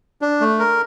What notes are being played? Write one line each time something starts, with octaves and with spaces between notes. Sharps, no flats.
D4
A3
A#4